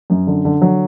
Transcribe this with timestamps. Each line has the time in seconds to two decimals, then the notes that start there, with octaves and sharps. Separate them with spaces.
0.10 F#2
0.27 D3
0.45 D3
0.62 F#3